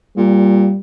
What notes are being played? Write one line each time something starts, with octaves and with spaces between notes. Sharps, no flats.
A#2 G3